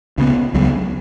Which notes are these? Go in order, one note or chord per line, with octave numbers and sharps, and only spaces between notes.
C#2 C#3 F#3 B3
C#2 C#3 F#3 B3